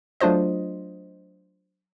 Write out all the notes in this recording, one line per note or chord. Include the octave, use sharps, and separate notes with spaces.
F#3 A3 D4 F4 C5 D#5